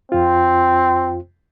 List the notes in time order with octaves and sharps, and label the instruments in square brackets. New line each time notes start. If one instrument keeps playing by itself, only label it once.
[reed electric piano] F2 F4 [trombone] C4